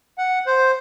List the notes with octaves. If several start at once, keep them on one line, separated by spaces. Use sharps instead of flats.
F#5
C5